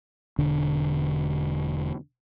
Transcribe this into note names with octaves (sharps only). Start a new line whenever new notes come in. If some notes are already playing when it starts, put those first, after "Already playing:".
E1 D3 D4